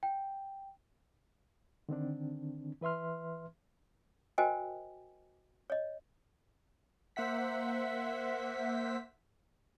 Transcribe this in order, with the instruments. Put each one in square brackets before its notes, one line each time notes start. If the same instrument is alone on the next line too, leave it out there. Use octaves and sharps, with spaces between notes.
[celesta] G5
[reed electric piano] D3 D#3 C4 D4
E3 B4 E5 C6 F6
[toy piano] F#4 A#4 C5 D#5 G5 G#5
C#5 D#5
[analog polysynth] A#3 C5 E5 F#5 B6